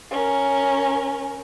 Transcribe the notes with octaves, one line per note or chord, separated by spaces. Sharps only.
C#4 A#4